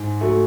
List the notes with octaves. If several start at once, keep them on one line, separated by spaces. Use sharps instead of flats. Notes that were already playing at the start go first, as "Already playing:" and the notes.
Already playing: G#2
F#3 A3